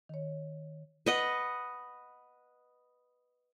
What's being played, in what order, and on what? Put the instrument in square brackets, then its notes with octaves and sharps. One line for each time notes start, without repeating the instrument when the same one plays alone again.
[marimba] D#3 C#5
[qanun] B4 D#5 F#5